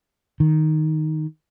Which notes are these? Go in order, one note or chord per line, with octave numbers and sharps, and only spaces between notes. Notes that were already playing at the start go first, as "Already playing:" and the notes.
D#3